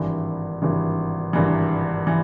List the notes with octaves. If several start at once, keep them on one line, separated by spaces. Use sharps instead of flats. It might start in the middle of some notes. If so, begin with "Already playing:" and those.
Already playing: G#1 G2 E3
G#1 G2 E3
G#1 G2 E3
E3